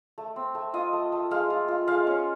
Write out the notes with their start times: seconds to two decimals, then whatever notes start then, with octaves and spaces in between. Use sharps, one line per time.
0.18 A3
0.36 C4
0.55 A3
0.74 F4 D#5
0.93 A3
1.12 A3
1.31 G#3 F5
1.50 F4
1.68 F4
1.88 G#3 F5
2.07 C#4